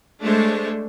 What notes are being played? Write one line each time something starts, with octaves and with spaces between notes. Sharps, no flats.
G#3 A3 D4 C5 C#5